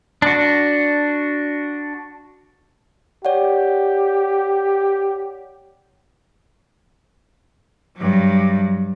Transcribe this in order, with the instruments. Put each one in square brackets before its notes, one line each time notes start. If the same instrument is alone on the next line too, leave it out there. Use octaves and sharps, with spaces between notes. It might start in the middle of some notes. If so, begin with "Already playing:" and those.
[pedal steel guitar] D4 F#4
[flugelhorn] G4 [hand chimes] C#5 D5 F#5
[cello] G2 F#3